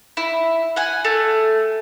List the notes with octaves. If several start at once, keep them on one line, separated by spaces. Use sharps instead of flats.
E4
F#5 G#5
A3